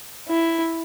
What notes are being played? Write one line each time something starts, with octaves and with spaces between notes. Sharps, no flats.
E4